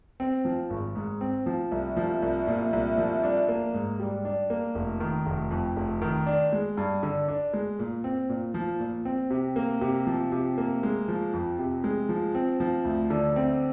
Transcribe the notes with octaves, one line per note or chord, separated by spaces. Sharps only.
C4
F3
G#1
G#2
C4
F3
C2
F3
C2
A#2
C2
F3
D4
A#3
G#2
G3
D4
A#3
F1
D#3
F1
F2
F1
D#3
D4
G#3
G2
D3
D4
G#3
A#2
C4
A#2
F3
A#2
C4
C3
A#3
C3
F3
C3
A#3
G#3
F3
F2
C3
G#3
F3
C4
F3
D2
D3
C4